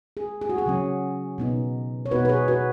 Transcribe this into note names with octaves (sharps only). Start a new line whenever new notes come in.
G#4
G#4
F#4
G#4
C#3 F#3 C#4
B2 B3 D#4
C#5
B2 B3 D#4 F#4 B4
B4
G#4 C#5
F#4 B4